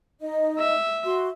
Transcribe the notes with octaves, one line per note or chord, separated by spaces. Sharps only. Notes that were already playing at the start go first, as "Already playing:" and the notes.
D#4 D#5
E5
F#4 C6